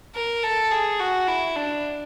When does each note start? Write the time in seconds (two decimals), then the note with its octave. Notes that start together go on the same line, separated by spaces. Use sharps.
0.15 A#4
0.43 A4
0.71 G#4
1.00 F#4
1.28 E4
1.56 D4